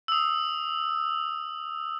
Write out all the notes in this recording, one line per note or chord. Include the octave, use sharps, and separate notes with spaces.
D#6 E6